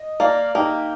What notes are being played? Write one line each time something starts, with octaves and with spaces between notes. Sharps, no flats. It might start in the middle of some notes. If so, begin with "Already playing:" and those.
Already playing: D#5
A#3 D5 F5
A#3 D#4 G4